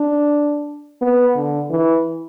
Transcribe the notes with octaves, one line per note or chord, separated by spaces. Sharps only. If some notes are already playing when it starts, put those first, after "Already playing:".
Already playing: D4
B3
D3
E3